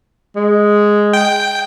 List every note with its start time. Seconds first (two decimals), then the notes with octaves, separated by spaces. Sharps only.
0.36 G#3
1.14 G5